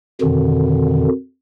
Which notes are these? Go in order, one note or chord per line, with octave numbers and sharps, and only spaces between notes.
F2 B2 D3 D#3